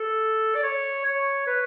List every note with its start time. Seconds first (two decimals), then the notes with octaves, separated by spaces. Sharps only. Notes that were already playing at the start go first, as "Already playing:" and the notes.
Already playing: A4
0.55 D5
0.63 C#5
1.05 C#5
1.47 B4